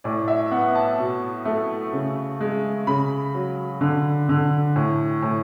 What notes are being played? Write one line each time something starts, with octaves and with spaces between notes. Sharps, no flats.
A2 D5
E5
B3 F#5
A5
B2
A3
C#3
G#3
C#3 B5
F#3
D3
D3
A2
A2